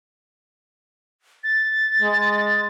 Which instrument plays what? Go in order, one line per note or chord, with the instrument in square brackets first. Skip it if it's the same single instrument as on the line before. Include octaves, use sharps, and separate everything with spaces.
[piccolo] A6
[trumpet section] G#3